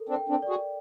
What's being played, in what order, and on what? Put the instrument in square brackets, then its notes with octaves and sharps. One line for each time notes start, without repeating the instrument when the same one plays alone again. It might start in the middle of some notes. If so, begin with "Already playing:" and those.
Already playing: [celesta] A4 A#4
[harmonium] C4 D4
[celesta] G5
[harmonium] C4 D4
[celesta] D5
[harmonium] F#4 G#4